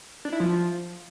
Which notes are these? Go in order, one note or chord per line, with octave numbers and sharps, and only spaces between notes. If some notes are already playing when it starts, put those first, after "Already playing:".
D4
E4
F3